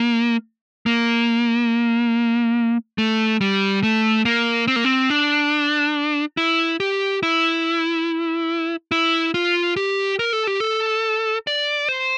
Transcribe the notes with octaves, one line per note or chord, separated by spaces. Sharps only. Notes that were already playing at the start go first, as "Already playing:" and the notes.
Already playing: A#3
A#3
A3
G3
A3
A#3
C4
A#3
C4
D4
E4
G4
E4
E4
F4
G4
A#4
A4
G4
A4
D5
C5